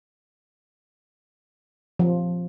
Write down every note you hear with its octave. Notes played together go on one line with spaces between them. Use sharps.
F3